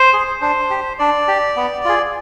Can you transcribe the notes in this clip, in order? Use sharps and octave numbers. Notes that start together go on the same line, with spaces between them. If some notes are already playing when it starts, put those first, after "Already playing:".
Already playing: C5
G#4
D4 C5
G4
D4 D5
G4
B3
F4 G#4